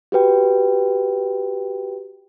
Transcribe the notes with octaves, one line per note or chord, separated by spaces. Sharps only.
F#4 G4 B4 G5